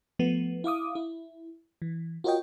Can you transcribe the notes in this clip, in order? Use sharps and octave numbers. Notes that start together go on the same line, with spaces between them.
F3 A3 B3
E4 F5 D6 D#6
E4
E3
F4 F#4 A#4 C#5 D#5 G5